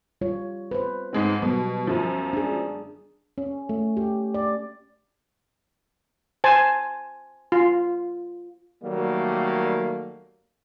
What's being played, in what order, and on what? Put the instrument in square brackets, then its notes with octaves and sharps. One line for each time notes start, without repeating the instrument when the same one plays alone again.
[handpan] G3 F4 C#5
B4 C5
[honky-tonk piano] G#2 G#3 C4
[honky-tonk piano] B2 [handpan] F#3 G3 B3
[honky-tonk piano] F#2 F3
[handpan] D4 G#4
C#4
A3
G4
D5
[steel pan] C5 G#5 A5
F4
[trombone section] D#3 F#3 G3 A3 A#3